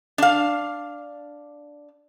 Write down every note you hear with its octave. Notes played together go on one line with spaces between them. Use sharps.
D4 F5